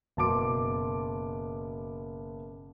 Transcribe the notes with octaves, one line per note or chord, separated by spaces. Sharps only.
F#1 B2 A5 C6 D6 D7